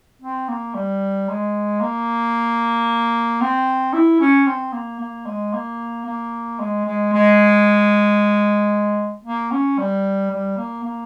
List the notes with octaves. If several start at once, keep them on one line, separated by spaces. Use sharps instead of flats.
C4
A#3
G3
G#3
A#3
C4
E4
C#4
C4
A#3
A#3
G#3
A#3
A#3
G#3
G#3
G#3
A#3
C#4
G3
G3
A#3
A#3